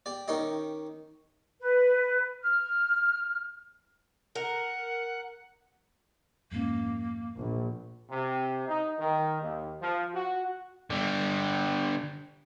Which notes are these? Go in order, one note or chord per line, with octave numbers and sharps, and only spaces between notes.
G4 D5
D#3 C#4 D#4 G4 D#5
B4
F6
A#4 F#5
F2 G#2 A#3 C#4
A#1
C3
D#4
D#3
D#2
F3
F#4
D3 G3